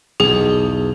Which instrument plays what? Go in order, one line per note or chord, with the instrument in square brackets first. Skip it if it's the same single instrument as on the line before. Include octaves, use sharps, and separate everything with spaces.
[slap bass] B1 E2 [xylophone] G#4